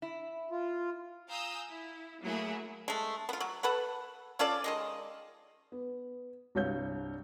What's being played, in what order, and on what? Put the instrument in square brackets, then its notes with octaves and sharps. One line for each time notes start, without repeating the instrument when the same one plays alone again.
[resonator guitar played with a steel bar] E4
[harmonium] F4
[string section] F5 G#5 A#5 D#6 E6 G6
E4
F#3 A3 A#3 E4 G#4
[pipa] G#3 A3
B3 F4
F#3
A4 B4 F#5
C#4 F4 A4 D5
D#3 G#3 D#5
[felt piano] B3
C2 G2 C#5 F5 G6